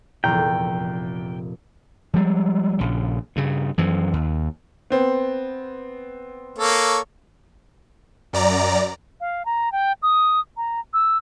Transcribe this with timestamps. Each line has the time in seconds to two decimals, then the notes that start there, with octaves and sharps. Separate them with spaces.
0.24 F1 E2 A#2 G5 A#5
2.14 F3 G3 G#3
2.79 A#1 C#3
3.36 G2 C#3
3.78 F#2 E3 F3
4.13 D#2
4.90 B3 C4
6.58 A#3 A4 C#5
8.33 F#2 D5 A#5
9.20 F5
9.45 A#5
9.72 G5
10.02 D#6
10.57 A#5
10.93 E6